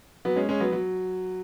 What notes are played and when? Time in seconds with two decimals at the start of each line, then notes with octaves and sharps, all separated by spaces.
0.25 F#3 B3
0.36 G#3 C#4
0.49 G#3 C#4
0.60 F#3 B3
0.72 F#3